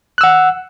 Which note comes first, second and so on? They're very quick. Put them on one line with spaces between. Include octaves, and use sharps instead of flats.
F#6 E6 F#5